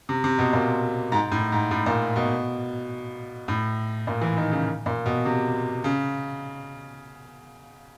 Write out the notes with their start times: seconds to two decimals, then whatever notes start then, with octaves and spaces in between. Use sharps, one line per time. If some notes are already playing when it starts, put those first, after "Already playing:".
0.09 C3
0.24 C3
0.39 B2
0.53 A#2
1.12 G#2
1.32 A2
1.52 G#2
1.71 A2
1.86 A#2
2.16 B2
3.48 A2
4.07 A#2
4.21 E3
4.37 D#3
4.52 C#3
4.86 A#2
5.06 B2
5.25 C3
5.84 C#3